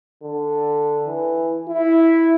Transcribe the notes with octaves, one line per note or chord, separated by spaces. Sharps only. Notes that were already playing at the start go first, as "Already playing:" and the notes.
D3
E3
E4